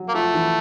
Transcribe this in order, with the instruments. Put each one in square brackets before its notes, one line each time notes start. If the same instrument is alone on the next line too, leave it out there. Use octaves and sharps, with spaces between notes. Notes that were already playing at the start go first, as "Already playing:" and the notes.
Already playing: [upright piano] F#3
[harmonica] A#3
[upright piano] F3 [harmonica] A3
[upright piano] E3